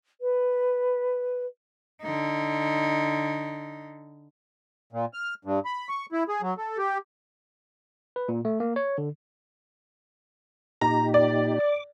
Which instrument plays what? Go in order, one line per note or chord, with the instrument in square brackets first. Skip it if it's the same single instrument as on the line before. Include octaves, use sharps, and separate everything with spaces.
[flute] B4
[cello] D3 D#4
[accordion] A#2
F6
G2
B5
C#6
E4
G#4
F#3
A4
G4
[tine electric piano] B4
A#2
A3
A#3
C#5
D3
[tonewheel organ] A#2 D#4 G4 [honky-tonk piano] A#5
[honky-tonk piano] D5
[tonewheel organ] D6